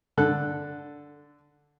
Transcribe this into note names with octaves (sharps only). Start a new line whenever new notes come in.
D3 A4 F#6